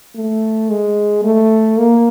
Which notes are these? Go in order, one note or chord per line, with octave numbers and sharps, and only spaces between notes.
A3
G#3
A3
A#3